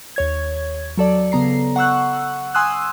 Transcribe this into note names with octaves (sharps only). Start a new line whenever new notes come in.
D#2 C#5 G#6
F#3 A4 D5
C#3 B3 A#5 C7
F#5 C#6 E6 F#6
G#5 C6 D#6 E6 F#6